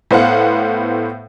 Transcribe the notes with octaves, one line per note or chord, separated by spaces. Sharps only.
A2 B3 C5 F5 F#5